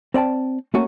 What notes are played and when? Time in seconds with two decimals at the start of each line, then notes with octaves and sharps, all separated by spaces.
0.14 C4 D5 G5 A5
0.74 A3 A#3 C#4 F#4